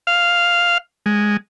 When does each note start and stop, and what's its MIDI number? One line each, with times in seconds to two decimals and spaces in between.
0.07 0.78 77
1.06 1.37 56